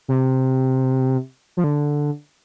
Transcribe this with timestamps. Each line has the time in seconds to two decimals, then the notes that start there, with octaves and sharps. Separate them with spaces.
0.08 C3
1.57 F3
1.64 D3